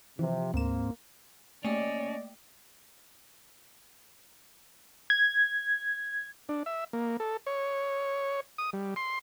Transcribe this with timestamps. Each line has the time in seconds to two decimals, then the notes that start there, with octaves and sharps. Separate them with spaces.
0.19 C3 E3 F3
0.54 D2 G#2 A#3 C4 E7
1.65 A3 A#3 C#4 D5 D#5 G5
5.10 G#6
6.49 D4
6.66 E5
6.93 A#3
7.20 A4
7.47 C#5
8.58 D#6
8.73 G3
8.96 C6